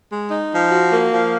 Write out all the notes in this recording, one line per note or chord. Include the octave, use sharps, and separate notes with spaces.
G#3
D#4
F3
F#4
A#3
F3